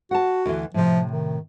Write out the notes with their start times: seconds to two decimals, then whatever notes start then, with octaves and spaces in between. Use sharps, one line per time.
0.11 F#4 F#5 A5
0.46 D2 E3
0.74 A2 C3 F3
1.11 D#3